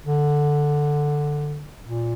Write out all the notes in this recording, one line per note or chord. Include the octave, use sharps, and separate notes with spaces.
D3
A#2